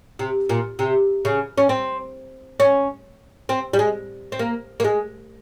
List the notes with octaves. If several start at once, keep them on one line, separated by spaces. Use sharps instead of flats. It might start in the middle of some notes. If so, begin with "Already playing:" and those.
C3
A#2
C3
C#3
C#4
C4
C#4
C4
G3
G#3
C4
A#3
A#3
G#3